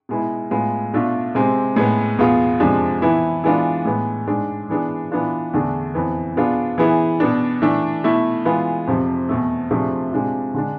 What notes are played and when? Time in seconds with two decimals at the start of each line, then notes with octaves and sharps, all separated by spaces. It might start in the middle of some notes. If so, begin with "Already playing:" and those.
0.09 B2 G#3 B3 E4
0.51 A2 G#3 B3 F4
0.93 B2 A3 D4 F4
1.35 C3 G#3 C4
1.76 A2 G#3 B3
2.18 E2 B2 B3 F4 G#4
2.60 F2 C3 F3 G#3 D4
3.02 E3 B3 E4
3.44 E3 G#3 B3 D4 F4
3.85 A2 G#3 B3
4.27 G#2 G#3 D4 G#4
4.69 E3 B3 D4 G#4
5.11 E3 B3 D4 F4
5.53 E2 D3 A3 D4 G#4
5.94 F2 E3 B3
6.36 B2 B3 D4 F4 G#4
6.78 E3 B3 E4 G#4
7.20 B2 B3 D4
7.62 E3 A3 D4
8.04 B2 A3 E4
8.45 E3 G#3 B3 F4 G#4
8.87 F2 C3 F3
9.29 E2 B2 A3
9.71 C3 F3 A3 D4 G#4
10.12 C3 G#3 D4 F4
10.54 D3 G#3 D4